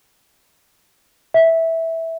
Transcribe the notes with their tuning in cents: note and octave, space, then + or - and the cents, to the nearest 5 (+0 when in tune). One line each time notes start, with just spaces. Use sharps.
E5 -10